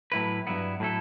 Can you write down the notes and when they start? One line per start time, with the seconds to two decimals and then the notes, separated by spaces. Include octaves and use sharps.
0.12 A2 F#3 A3 E4 B4
0.47 G2 F#3 B3 E4
0.80 A2 F#3 A3 E4 A4